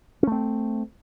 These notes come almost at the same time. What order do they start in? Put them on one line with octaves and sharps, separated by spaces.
C#4 A3 C4